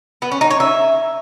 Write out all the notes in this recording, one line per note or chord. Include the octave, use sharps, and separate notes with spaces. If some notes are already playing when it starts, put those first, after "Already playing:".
B3
C#4
D#4
C#5
E5